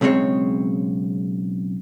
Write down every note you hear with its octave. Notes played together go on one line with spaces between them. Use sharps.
B1 C#3 G#3 C4 C#5